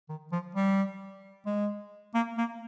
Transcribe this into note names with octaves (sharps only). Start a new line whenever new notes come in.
D#3
F3
G3
G#3
A#3
A#3